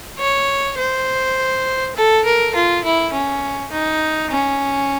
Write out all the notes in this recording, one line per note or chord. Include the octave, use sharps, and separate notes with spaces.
C#5
C5
A4
A#4
F4
E4
C#4
D#4
C#4